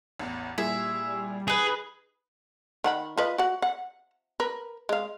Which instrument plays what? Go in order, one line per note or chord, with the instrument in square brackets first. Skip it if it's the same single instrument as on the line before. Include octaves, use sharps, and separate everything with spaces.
[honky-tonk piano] A1 E2
[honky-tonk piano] A#2 E4 G#4 [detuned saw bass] G3 [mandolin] E5
[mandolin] D#4 B4 [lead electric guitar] G#4 G#5
[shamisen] D#3 F#5 B5
F4 B4 D#5
F#4 F#5
F#5
A#4 B4
G#3 F5